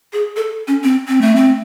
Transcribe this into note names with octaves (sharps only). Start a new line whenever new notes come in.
G#4
A4
C#4
C4
C4
A3
C4